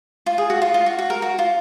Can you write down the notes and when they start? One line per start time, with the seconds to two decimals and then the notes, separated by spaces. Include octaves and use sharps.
0.26 F4
0.38 G#4
0.50 F#4
0.62 F4
0.74 F4
0.86 F#4
0.99 F#4
1.10 A#4
1.22 F#4
1.39 F4